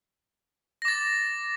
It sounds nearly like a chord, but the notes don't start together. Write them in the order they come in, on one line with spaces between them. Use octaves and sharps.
A#6 D6 A6